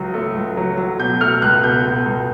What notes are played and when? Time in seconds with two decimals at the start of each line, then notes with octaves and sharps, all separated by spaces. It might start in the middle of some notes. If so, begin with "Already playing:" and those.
Already playing: C#2 F#3
0.14 A3
0.35 C#2
0.57 F#3
0.78 F#3
0.99 B2 G6
1.20 A3 F6
1.42 C#2 F#6
1.63 B2 G6
1.85 B2
2.06 C#2